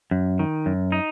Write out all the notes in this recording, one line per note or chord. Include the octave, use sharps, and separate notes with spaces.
F#2
D#3
F#2
D#4